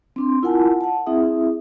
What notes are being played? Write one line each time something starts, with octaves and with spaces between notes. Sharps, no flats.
C4 D4 C6
E4 F4 A#4 F#5 G#5 A5
F#5 A5
C4 E4 G#4 E5 D#6